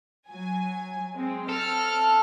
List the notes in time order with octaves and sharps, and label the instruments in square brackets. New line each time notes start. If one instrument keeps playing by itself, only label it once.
[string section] F#3 G#5
G#3 C4
[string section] C4 F6 [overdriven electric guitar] A4